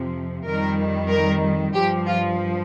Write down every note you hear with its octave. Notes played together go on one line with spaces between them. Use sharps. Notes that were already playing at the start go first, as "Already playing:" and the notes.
Already playing: F2 C3 F3
F2 D#3 G3 A#4
A#4
G2 F3 G4
F4